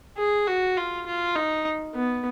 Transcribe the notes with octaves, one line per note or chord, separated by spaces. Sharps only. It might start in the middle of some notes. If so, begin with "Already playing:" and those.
G#4
F#4
F4
F4
D#4
B3